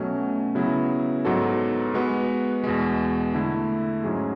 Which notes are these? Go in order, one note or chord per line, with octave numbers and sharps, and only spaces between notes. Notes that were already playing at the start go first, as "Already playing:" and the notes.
Already playing: B2 F#3 A3 C#4
C#3 F#3 B3 E4
G#2 F#3 B3 F#4 A4
G#3 B3 F#4 B4
E2 B2 G#3
D3 A3 E4
G#2 F#3 C#4 G#4